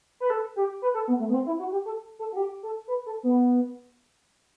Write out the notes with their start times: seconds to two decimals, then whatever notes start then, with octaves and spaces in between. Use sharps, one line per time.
0.20 B4
0.30 A4
0.56 G4
0.82 B4
0.94 A4
1.08 B3
1.20 A3
1.29 B3
1.34 C4
1.46 E4
1.59 F#4
1.72 G4
1.85 A4
2.19 A4
2.32 F#4
2.36 G4
2.63 A4
2.88 B4
3.06 A4
3.23 B3